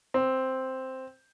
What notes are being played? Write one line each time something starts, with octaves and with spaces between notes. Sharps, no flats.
C4